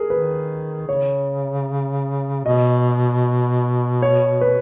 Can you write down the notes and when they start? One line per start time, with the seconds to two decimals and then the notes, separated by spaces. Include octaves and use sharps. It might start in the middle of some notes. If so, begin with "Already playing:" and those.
Already playing: G#4 A#4
0.10 D#3 B4
0.88 C#3 C#5
2.45 B2 D#5
4.02 C#5
4.41 B4